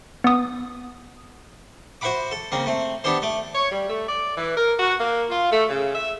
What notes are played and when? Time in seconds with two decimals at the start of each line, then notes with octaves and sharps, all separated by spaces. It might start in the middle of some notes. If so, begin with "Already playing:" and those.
0.24 B3 D#6
2.01 F#4 C5 E5 F#5 B5 D6
2.31 A4
2.52 C#3 A#3 C4
2.66 A3 C4
3.04 B3 D4 G4 A4 C5
3.22 A3 D6
3.55 C#5
3.71 G3
3.88 A3
4.07 D5
4.36 E3
4.56 A#4
4.79 F#4
4.99 A#3
5.30 F4
5.51 A3
5.69 C#3
5.95 E5